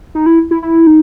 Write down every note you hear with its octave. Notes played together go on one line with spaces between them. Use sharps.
D#4
E4
E4
E4
D#4